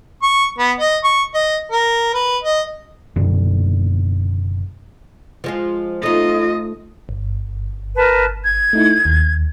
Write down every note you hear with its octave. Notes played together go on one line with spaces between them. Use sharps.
C#6
B3
D#5
C#6
D#5
A#4
B4
D#5
F#1 F#2 B2 D3
F3 G#3 F4
A3 D#4 F4 D#5
G1
A#4 B4 A5
G#6
A3 D#4 E4
D#2